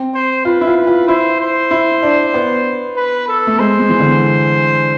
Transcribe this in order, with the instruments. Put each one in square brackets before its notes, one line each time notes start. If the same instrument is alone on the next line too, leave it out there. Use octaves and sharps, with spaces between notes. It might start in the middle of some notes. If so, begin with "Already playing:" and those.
Already playing: [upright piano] C4
[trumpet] C5
[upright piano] F4 [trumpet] B4
[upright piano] E4
F4
[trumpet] B4
[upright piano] F4
[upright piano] E4 [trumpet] C5
[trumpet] C5
[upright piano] E4
D4
B3
[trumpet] B4
A4
[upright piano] A3
[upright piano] G#3 [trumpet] C5
[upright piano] G#3
E3
D3